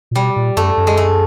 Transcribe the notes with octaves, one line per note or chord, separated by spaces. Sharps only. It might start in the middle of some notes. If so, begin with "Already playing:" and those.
A#2
B2 G3
A#2
F#2 A3
F#2
G#3
A3